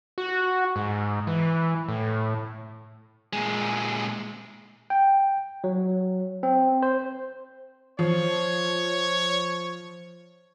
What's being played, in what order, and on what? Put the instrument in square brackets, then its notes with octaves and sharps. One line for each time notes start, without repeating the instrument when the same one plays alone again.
[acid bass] F#4
G#2
E3
A2
[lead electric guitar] A#2 G#3
[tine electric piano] G5
F#3
C4
C5
[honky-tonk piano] F3 [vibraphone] C5 [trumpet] C#5